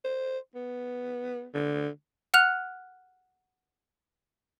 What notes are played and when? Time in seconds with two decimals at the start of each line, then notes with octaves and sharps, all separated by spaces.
0.05 C5
0.55 B3
1.54 D3
2.34 F#5 F6 F#6 F7